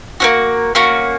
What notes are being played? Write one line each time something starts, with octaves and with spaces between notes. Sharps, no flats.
A#3 C#4 F#4
A#3 C#4 F#4